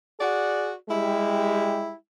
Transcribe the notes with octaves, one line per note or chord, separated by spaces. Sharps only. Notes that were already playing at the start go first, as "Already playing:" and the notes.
F#4 G#4 D5 F#5
G3 G#3 E4 G4